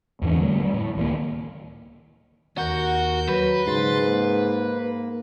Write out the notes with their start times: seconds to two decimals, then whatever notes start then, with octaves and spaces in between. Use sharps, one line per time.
0.22 E2 G#2 E3 D4
0.37 D3 G3 A3
0.62 F#3 G3
0.74 A2
0.97 C#2 D#3 E3 A#3
2.58 D#2 F#4 A#4 G6
3.29 F#3 B4
3.67 G#2 C#3 C6 A6
4.03 A#3